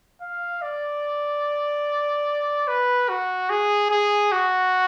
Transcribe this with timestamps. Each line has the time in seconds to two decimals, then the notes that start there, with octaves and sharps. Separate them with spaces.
0.21 F5
0.62 D5
2.68 B4
3.09 F#4
3.50 G#4
3.91 G#4
4.32 F#4